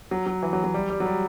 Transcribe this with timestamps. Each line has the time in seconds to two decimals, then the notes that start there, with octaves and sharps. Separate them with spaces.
0.11 F#3
0.26 F#3
0.43 E3
0.53 F#3
0.64 F#3
0.74 G3
0.90 G3
1.00 F#3
1.06 G3